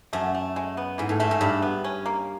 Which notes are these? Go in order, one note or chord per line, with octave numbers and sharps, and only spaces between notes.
F#2 A3
A3
G#3
B3
G#2 E3
A2
G#2 A3
G#2
G2 G3
B3
C#4
A#3